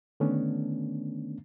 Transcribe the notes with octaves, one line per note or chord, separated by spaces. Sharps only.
D3 D#3 A3 B3 C#4 D4